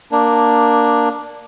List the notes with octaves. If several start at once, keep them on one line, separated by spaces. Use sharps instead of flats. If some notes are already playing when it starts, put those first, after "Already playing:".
A#3 D4